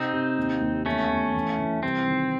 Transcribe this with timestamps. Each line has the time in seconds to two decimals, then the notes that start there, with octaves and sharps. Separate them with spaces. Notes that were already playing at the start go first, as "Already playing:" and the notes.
Already playing: C3 C4 D#4
0.13 C3
0.38 D#2
0.61 D#2
0.86 E2 A3 C#4
1.11 E2
1.34 E3
1.59 E3
1.83 C2 C4
2.07 D#3